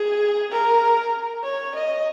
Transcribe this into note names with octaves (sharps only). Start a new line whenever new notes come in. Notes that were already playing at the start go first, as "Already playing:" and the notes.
Already playing: G#4
A#4
C#5
D#5